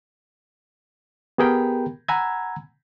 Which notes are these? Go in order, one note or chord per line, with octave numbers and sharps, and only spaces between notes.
B3 G4 G#4 A#4 G5 B5
F#5 G#5 A#5 B5 E6 G#6